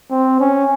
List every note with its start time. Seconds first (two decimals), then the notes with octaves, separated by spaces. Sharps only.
0.10 C4
0.40 C#4